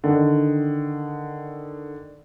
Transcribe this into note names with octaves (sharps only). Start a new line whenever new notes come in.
D3 D#3